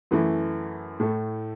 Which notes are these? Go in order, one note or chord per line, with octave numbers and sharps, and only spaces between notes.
F#2 E3 A3 E4
A2 A3 E4 A4